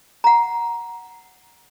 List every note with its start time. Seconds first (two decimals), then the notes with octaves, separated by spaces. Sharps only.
0.24 F#5 A#5